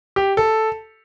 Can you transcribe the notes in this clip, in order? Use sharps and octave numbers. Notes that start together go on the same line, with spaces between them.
G4
A4